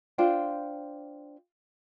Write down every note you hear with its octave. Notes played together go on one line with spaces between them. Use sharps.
D4 F4 C5 G5